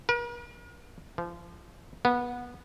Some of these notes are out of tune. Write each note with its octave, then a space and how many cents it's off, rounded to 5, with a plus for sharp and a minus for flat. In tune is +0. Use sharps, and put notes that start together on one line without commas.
A#4 +45
F3 -25
B3 -20